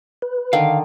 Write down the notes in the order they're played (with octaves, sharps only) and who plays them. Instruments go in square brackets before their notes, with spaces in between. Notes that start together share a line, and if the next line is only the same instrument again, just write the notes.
[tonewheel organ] B4
[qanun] D3 D#3 [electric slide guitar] F5